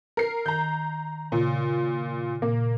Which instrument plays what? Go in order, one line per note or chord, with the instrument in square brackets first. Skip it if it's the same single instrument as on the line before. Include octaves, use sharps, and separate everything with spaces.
[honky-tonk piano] A#4 C7
[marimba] D#3 [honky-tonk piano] A#5 G6
[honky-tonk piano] A#2 [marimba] C#3
[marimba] A#2 [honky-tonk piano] A#3